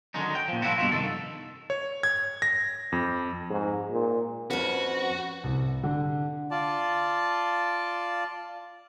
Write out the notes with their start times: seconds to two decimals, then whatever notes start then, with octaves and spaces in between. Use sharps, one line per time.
0.14 D3 D#3 F#3 G#3 C#4 D#4
0.35 G5
0.48 A#2 F3
0.62 F3 G3 A#3 E4 F#4
0.78 G2 B2 E4 F4
0.92 C2 D#3 A4
1.70 C#5
2.03 G#6
2.42 A#6
2.92 F2
3.51 G#2
3.91 A#2
4.50 F2 C#4 F#4 B4
5.44 C2
5.83 D3
6.51 F4 D5 A5